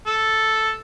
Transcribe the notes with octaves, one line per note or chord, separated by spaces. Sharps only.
A4